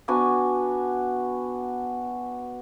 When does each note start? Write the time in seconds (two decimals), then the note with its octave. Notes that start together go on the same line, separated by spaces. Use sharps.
0.08 B3 D4 F#4 G#5